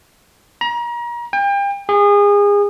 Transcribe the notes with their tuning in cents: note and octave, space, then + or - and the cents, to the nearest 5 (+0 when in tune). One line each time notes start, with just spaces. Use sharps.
A#5 +35
G5 +35
G#4 -30